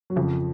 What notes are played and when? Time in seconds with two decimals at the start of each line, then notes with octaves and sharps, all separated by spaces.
0.10 F#3
0.16 F2 C#3 F3